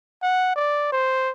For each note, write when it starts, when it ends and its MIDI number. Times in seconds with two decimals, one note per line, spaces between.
0.23 0.52 78
0.56 0.90 74
0.92 1.31 72